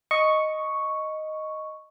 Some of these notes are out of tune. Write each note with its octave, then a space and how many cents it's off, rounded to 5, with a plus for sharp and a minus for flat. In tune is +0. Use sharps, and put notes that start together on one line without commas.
D#5 +0 C#6 +0